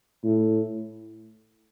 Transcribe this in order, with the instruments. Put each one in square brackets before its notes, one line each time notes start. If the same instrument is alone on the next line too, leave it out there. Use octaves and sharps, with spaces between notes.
[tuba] A2